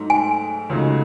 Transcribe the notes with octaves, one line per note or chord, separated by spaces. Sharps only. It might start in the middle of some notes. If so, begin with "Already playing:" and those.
Already playing: G#2 F#3 A3 D#4 A4
G#5
C#2 C#3 F#3 A3 D#4